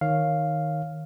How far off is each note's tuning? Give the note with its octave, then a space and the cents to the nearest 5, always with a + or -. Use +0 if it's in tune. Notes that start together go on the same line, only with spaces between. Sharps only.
D#3 +0 C#5 +0 F5 +0